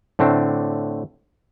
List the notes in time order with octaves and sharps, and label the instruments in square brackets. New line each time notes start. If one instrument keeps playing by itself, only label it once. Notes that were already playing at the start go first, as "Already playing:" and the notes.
[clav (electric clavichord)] A2 D3 A3 C4 D4